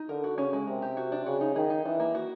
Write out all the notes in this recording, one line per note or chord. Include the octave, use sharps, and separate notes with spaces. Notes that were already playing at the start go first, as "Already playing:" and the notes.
Already playing: D#4
D3 A#4
F#4
C#3 C#4
G#3
C3 A#4
G4
F#4
D4
C#3 F#4
D#4
D#3 G#4
D#4
E3 D4
A#3
F#4